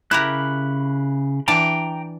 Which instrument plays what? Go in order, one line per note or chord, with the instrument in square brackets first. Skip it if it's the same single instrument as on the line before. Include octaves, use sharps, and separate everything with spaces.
[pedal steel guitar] C#3 B5 F#6 [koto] E4 G4 A#4
[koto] E3 D4 D5 [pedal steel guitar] G5 A#5